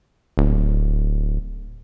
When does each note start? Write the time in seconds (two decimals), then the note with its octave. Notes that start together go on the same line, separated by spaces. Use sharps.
0.38 D1